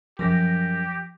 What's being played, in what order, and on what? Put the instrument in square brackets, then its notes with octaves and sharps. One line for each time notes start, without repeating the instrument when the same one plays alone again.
[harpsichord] F#2 [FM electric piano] F3 A#6 [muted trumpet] G4